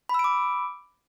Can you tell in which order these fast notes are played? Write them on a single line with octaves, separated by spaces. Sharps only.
B5 E6 D7 D6